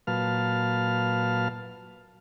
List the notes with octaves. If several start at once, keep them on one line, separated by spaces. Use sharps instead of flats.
A#2 F#3 B4 F5 A5 F6